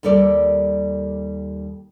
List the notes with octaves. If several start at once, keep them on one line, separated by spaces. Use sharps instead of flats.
D#2 G3 A4 A#4 D5